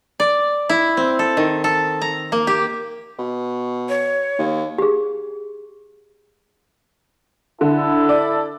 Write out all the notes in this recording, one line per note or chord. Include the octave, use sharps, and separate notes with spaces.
D5
E4
C4
A4
D#3
A4
A#5
A#3
G4
B2
C#5
D#2
G4 G#4
D3 E4 A4
D5